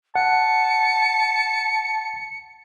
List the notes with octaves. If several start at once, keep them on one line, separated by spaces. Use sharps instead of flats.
F#5 A5 C#7